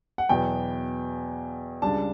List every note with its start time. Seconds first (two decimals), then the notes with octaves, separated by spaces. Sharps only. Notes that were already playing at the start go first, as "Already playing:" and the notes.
0.18 F#5
0.29 E2 B2 F#3 B3 G5
1.82 C#2 C#3 G3 D4 A5